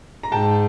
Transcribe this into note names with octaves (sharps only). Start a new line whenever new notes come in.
A#5
G#2 G5 A5